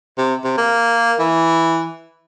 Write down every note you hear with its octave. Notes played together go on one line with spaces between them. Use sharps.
C3
C3
A#3
E3